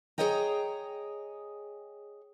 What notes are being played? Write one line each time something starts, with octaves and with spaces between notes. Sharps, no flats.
G#4 A#4 C#5 D#5 G5 A#5